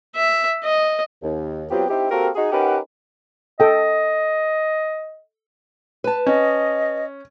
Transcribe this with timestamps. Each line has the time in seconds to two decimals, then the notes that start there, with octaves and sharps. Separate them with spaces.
0.16 E5
0.64 D#5
1.23 D#2
1.71 F#3 B3 C4 F4 G4
1.90 C4 D#4 E4 G4
2.11 A#3 C4 F#4 G4 A4 A#4
2.36 D#4 F#4 G#4
2.52 C#4 D#4 G4 A#4 B4 F#5
3.60 A4 D#5 G5
6.04 B4 A5
6.26 C#4 D#5